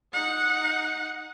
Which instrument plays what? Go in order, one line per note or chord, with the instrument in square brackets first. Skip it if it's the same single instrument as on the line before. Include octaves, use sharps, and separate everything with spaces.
[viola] D#4 F#5